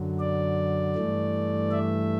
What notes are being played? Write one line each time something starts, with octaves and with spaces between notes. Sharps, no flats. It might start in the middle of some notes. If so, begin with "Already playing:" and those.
Already playing: F#2 D3 F#3
D5
G2 E3 A3
E5